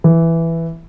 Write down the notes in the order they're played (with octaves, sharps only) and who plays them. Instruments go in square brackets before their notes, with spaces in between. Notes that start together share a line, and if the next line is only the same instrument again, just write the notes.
[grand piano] E3